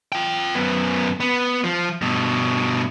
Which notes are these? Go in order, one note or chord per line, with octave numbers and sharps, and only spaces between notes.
F4 G5
F#2 B3
B3
F3
G2 B2